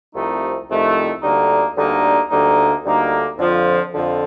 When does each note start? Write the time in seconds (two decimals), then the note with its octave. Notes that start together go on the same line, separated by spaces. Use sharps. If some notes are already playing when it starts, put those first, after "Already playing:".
0.14 C2 C3 F3 A3 D#4
0.68 C2 C3 F3 A3 D#4
1.23 D2 D3 G3 A#3 D#4
1.77 D2 D3 G3 A#3 D#4
2.30 D2 D3 G3 A#3 D#4
2.85 D2 D3 G3 A#3 D#4
3.38 F2 D3 F3
3.92 F2 D3 F3